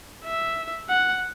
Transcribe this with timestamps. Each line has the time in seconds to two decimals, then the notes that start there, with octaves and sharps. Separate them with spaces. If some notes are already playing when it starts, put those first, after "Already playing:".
0.25 E5
0.89 F#5